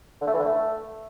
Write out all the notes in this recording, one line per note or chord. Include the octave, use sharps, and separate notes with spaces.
D3
A3
E3
D3
A3